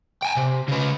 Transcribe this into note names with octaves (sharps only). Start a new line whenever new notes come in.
G5 G#5
C3
C#3 B4